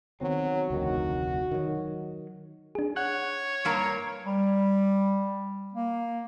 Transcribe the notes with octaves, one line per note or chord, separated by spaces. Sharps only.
D#3 F#3 B3 C4
F1 D2 D#3 F#4
D#3 F#3
D4 G#4
C#5 F#5 F#6
G2 A#3 A#5
G3
A#3